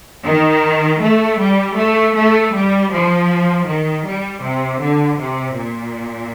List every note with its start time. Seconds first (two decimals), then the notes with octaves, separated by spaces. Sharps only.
0.24 D#3
1.00 A3
1.38 G3
1.76 A3
2.14 A3
2.52 G3
2.91 F3
3.66 D#3
4.05 G3
4.42 C3
4.80 D3
5.18 C3
5.56 A#2